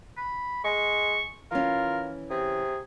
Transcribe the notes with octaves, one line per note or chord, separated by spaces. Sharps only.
B5
G#3 C#6
E3 C#4 F4 A#4
C3 G#4